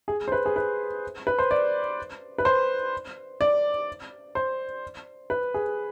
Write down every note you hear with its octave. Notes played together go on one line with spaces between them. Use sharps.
G#4
C5
B4
G#4
B4
B4
C5
D5
B4
C5
D5
C5
B4
G#4